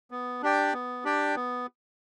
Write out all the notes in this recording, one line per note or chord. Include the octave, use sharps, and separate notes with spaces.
B3
D4 G4 D5 G5
B3
D4 G4 D5 G5
B3